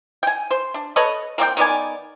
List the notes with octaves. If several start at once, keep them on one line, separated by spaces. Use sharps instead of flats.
G5 G#5
C5
D4
A4 B4 C#5 D#5
A#3 C4 D5 G5
D#3 B3 D5 G#5